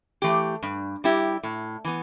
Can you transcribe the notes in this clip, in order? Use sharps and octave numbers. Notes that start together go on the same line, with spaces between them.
E3 A3 G4
G2
G3 E4 G4
A2
E3 B3